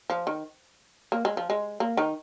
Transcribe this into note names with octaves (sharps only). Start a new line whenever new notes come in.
F3
D#3
A#3
G#3
F3
G#3
A#3
D#3 D#4